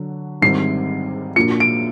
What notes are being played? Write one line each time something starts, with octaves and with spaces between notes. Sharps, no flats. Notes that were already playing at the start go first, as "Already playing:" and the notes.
Already playing: D3 F#3
G#2 D#3 G3 C4 C7
A#2 F3 A#3 D4 F#4 C#7
D7